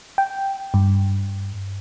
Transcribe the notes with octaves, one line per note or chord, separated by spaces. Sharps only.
G5
G2